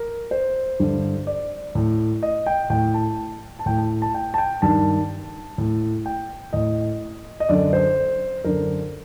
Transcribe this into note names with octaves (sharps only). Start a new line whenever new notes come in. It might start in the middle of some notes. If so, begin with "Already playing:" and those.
Already playing: A#4
C5
G2 D3
D5
A2
D#5
G5
A2 G5
A5
A5
A2 G5
A5
A5
G5
A5
G5
G2 D#3 A5
A2
G5
A2 D#5
D#5
F#2 D3 D5
C5
F#2 D3 A#4